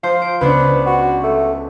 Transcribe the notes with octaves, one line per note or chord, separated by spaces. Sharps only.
F3 C5
D7
C#2 B3 D4 B4
F#4
A3